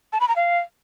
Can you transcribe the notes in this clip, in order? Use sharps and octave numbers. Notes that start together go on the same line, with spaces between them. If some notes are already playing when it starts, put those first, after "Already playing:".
A5
B5
A#5
F5